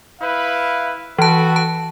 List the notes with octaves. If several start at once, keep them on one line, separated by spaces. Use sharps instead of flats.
E4 B4 F5
E3 F#4 A4 B4 A5
A5